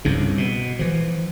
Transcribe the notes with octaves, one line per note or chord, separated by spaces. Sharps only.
C2 G2 C#3
B2
E3 F3